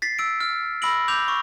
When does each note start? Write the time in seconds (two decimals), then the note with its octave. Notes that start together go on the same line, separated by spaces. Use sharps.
0.02 A6 B6 C7
0.19 E6 D7
0.40 F6
0.82 B5 E6 A#6 D7 F#7
1.08 D6 G6 F7
1.28 C#6